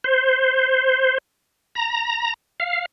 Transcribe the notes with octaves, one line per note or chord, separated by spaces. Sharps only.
C5
A#5
F5